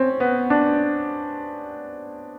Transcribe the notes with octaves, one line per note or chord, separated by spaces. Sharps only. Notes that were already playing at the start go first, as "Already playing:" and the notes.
Already playing: C4 C#4
B3
D4